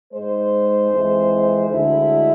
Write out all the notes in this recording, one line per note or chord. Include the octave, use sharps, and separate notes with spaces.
G#2 G#3 C5
F2 E3 G#3
D2 D3 G#3 E4